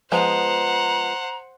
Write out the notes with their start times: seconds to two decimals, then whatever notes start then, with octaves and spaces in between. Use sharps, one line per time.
0.12 F3 G#3 B3 C5 F#5 A#5